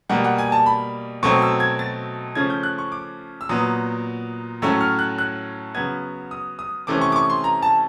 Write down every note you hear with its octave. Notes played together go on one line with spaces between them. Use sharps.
B2 G3 A#3 F#5
F#5
G#5
A5
B5
B2 F#3 A3 C4 C#6
E6
G#6
A6
C#3 F3 A3 C#4 G#6
G6
F#6
C#6
D6
E6
A#2 F#3 B3 D#6
A2 F#3 A3 C#4 E6
F6
F#6
F#6
C#3 F#3 B3 G#6
D#6
D#6
C3 E3 A3 C#4 D6
C#6
D6
C#6
C6
A#5
A5